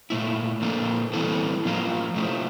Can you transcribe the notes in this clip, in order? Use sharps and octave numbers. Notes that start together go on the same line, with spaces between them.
A#2 A3 E4
A#2 F3 A#3 D4 A4
E3 G3 C4 E4 A4
A2 F3 A#3 F4 A#4
F3 A3 E4